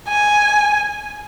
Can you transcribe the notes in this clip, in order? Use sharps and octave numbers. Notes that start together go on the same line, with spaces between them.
G#5